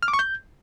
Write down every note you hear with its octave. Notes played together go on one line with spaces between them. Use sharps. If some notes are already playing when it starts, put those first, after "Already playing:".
F6
D6
C#6
G6